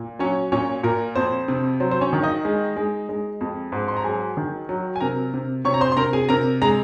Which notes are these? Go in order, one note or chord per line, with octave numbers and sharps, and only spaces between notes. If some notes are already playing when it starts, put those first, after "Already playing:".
Already playing: A#2
F#3 C#4 C#5
A#2 C#4 C#5
A#2 A#4
F2 C5
C3
F#3 C5
C5
C#4 C#5
D#3
D#4 D#5
G#3
G#3
G#3
F2
G#2
C6
A#5
F#3 G#4 G#5
D#3
F#3
G#5
C3 A#4 A#5
C3
C3 C#5 C#6
A#5
C5 C6
C6
C3 A#4 A#5
G#4 G#5
C3 A#4 A#5
G#3 A#5